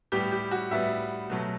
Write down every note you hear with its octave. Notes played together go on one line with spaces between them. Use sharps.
A2 G3 B3 G4
G4
F#4
A2 G3 B3 E5
B2 F#3 A3